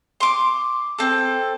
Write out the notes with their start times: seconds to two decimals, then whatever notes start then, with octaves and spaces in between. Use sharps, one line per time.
0.20 C6 D6
0.99 C4 A4